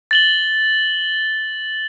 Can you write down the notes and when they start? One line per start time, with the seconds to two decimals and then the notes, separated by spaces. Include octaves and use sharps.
0.11 A6 F#7 G7